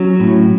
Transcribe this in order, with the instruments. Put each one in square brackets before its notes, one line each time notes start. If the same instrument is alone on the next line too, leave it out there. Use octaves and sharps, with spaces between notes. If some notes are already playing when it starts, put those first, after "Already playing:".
Already playing: [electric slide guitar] F#3 C#4
A2